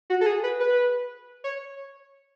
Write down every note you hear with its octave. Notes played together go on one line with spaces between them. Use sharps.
F#4
A4
G#4
B4
B4
C#5